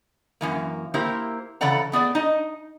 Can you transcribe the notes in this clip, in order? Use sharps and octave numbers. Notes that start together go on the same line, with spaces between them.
F#2 E3 A#3
A#3 E4 G4 A#4 C5 E5
C#3 E3 A4 D5 F#5 A#5
A3 B3 G#4 D5
D#4 D#5